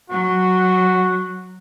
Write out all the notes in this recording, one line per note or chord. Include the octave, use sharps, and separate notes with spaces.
F#3 F#4